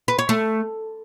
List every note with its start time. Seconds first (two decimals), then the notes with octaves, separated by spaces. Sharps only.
0.08 B4
0.18 C#5
0.29 A3